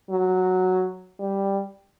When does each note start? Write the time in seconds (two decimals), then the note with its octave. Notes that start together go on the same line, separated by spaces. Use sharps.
0.10 F#3
1.19 G3